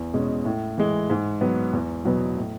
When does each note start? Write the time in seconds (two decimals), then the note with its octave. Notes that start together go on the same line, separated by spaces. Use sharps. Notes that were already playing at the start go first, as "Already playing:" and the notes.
Already playing: E2
0.14 B2 G#3 C#4
0.45 A2
0.78 E3 G#3
1.10 G#2
1.41 F#3 B3
1.73 E2
2.05 B2 F#3 B3
2.37 A2